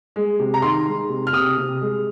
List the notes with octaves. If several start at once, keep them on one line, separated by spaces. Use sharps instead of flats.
G#3
C3
A#5
D#3 C6
G#3
C3
F6
C3 D#6
C3
G#3